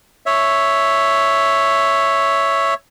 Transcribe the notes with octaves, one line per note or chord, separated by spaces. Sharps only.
C#5 E5